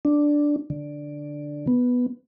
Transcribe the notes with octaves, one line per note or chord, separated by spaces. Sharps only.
D4
D3
B3